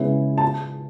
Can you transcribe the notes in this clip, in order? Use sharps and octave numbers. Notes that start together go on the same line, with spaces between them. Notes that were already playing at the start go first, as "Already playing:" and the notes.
Already playing: C#3 G#3 B3 E4
A5